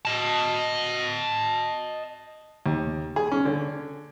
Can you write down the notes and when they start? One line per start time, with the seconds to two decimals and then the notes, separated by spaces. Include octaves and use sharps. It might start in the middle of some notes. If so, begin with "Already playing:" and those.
0.05 D#5 A5
2.66 D#2
3.16 G#4
3.32 C#4
3.45 D3